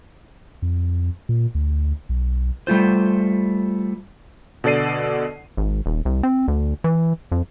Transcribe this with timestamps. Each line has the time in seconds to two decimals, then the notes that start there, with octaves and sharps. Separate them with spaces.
0.62 F2
1.29 A#2
1.55 D2
2.09 B1
2.67 G3 A3 F4 C5
4.64 B2 D3 A4 D5 C7 D#7
5.57 G#1
5.86 D#1
6.05 C2
6.23 C4
6.48 D2
6.84 E3
7.32 F2